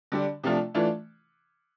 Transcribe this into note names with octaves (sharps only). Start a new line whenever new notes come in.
D3 G3 D4
C3 F3 A3 D4 F4
E3 A3 D4 F4